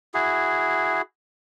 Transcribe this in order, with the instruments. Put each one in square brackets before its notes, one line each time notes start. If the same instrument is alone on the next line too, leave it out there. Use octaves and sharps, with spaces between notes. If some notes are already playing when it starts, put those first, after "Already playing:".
[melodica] E4 F#4 G#4